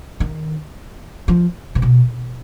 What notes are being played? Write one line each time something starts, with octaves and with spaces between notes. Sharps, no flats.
D#3
F3
C3
B2